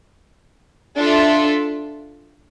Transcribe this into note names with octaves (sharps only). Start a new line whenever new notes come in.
D4 F4 A4 E5